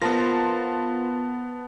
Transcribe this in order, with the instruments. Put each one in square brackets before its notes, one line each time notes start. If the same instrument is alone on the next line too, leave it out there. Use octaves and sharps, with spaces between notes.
[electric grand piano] B3 A5 A#6 [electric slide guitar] F4 A#4 C5